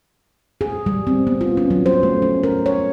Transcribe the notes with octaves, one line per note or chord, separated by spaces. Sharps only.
G#4
G3
C4
B3
F4
C#4
F#3
C5
A3
C#4
A#4
C#5